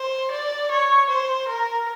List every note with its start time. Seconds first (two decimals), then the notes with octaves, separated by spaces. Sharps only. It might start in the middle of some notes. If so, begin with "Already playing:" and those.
Already playing: C5
0.31 D5
0.71 C#5
1.09 C5
1.48 A#4